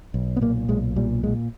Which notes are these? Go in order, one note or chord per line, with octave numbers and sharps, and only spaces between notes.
B1
B3
A#2 A#3
B1 G#3
A#2 G3
A#2 G#3